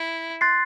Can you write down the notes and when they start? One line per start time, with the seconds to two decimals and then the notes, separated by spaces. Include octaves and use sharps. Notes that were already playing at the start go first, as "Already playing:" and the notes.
Already playing: E4
0.41 C6 F#6 A6 C7